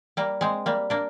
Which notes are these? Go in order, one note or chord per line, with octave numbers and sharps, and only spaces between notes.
G3 A#3
G#3 C4
G3 A#3
A#3 D4